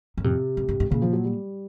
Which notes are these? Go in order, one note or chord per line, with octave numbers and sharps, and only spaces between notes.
F#2
F2 C3
F#2
G2
G2
A#2 C#3
F3
F#3
G3